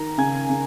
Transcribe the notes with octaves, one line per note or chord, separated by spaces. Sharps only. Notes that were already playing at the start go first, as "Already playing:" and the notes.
Already playing: D#3 A#5
C#3 G#5
C#3